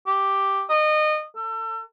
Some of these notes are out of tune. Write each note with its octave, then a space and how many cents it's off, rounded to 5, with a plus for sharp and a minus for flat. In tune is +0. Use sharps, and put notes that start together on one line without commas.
G4 +0
D#5 -25
A4 +30